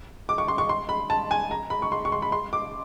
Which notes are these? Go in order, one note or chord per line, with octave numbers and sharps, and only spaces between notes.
D6
C#6
C6
C#6
C6
B5
A5
G#5
A#5
B5
C#6
C6
C#6
C6
B5
C6
D6